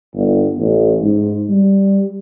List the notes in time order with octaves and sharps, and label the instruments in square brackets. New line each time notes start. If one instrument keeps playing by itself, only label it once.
[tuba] G1
A1
G#2
G3